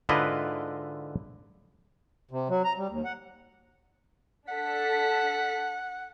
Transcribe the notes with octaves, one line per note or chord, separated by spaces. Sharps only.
G#2 D3 E4 F4 B4 D#5
C3
F#3
A#5
G3
D#2
F#5
D4 A4 F#5 B6